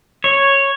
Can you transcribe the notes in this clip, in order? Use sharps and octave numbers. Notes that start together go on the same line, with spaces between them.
C#5